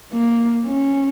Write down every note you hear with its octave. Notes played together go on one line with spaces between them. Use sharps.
A#3
C#4